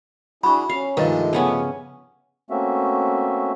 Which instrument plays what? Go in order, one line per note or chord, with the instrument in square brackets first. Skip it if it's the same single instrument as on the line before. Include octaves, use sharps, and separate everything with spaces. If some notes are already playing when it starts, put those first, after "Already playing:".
[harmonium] D4 E4 G#4 [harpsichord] F#4 [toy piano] B5 C#6
[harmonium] C#4 [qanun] F5
[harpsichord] G2 C3 F3 [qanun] D#3 [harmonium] G#3 A3 [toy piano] B4 D#5
[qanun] C#3 B3 C#4
[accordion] A3 A#3 C4 C#4 F#4 E5